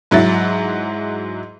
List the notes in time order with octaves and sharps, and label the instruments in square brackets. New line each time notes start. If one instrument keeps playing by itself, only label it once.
[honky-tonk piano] G#2 F#3 E4 A6